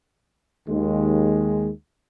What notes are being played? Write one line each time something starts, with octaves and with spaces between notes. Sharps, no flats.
D#2 G#3